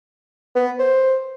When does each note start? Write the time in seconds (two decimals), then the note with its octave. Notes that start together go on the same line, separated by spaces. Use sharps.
0.55 B3
0.79 C5